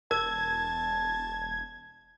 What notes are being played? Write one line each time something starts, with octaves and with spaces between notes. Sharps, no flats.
E1 A#4 A5 G#6